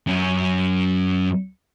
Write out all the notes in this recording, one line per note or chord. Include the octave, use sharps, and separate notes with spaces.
F#2 C#4